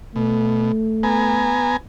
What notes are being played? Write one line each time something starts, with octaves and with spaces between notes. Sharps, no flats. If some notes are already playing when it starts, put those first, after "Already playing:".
B2 A3
B3 G#5 A#5